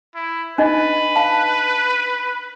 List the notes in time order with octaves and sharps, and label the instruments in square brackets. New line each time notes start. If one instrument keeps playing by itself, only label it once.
[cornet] E4
[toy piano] D4 D#4 D#5 [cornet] B4
[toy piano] F5 A5